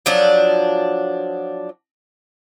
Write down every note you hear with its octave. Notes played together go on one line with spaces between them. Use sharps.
F3 F#3 D4